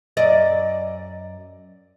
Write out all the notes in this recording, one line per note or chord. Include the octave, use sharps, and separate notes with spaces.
F#2 D5 D#5